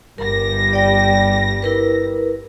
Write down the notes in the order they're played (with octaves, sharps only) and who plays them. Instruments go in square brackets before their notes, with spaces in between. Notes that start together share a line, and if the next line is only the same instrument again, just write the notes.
[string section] G1 G3 A#6 [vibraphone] A#4
[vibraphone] D5 G5
E4 A#4 B4